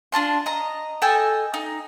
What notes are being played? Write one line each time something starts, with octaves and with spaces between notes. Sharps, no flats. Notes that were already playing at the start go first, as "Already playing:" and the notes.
D4 F4 A5 C6
D#5 A#5
A4 D#5 G5 G#5
D#4